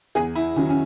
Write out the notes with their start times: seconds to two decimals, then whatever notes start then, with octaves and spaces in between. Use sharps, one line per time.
0.15 E2 G#4
0.35 E4
0.56 D#3 F#3 C#4
0.69 C#4